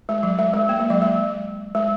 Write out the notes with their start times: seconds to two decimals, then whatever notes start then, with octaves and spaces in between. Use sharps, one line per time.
0.09 G#3
0.23 F#3
0.39 G#3
0.53 G#3
0.69 A#3
0.80 G#3
0.90 F#3
1.02 G#3
1.75 G#3